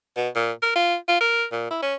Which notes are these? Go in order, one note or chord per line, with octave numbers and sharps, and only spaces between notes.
B2
A#2
A#4
F4
F4
A#4
A#2
E4
C#4